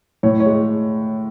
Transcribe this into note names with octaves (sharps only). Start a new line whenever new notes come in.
A2 C#5
C#5
G#3